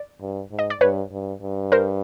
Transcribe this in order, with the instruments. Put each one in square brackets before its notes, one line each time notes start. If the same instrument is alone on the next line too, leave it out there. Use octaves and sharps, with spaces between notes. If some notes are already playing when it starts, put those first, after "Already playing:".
Already playing: [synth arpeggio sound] D5
[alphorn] G2
G#2
[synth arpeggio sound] D#5
D5
[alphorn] G2 [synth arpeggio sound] B4 C#5
[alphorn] G2
G2
[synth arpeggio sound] A#4 C5